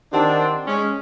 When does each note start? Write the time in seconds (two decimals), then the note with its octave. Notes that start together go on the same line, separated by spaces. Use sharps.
0.13 D#3 C4 D4 G4 F#5 A5
0.67 G#3 C#4